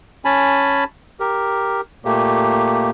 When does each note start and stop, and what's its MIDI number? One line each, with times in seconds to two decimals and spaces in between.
0.25 0.84 61
0.25 0.84 80
0.25 0.84 81
0.25 0.84 83
1.20 1.81 67
1.20 1.81 70
2.05 2.90 46
2.05 2.90 57
2.05 2.90 58
2.05 2.90 67